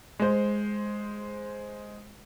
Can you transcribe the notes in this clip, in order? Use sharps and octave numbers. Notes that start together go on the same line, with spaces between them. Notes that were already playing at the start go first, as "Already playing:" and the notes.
G#3 C5